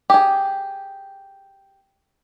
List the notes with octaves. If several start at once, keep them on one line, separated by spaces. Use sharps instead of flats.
G4 G#4